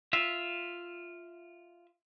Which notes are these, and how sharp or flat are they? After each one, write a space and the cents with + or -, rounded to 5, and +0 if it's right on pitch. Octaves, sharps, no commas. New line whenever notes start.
F4 -5 E5 +0